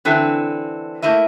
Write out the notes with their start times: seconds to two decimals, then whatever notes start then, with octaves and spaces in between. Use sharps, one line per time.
0.05 D3 E3 C4 A4
1.02 A3 A#3 E4 D#5